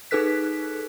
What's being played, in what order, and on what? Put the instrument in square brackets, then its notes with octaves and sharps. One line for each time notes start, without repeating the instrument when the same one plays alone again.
[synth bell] D#4 G#4 A4 B4 F#6 B6